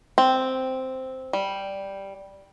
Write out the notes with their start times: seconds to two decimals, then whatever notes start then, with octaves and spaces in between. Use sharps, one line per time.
0.18 C4
1.33 G3